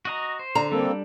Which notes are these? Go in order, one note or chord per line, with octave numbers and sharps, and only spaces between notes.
F#4 D#5 A#5
C5
D3 A#5
G3 A#3 C4 D4 A4